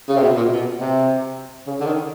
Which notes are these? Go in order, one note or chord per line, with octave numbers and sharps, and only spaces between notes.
C#3
C3
B2
A#2
B2
C3
C#3
D3
D#3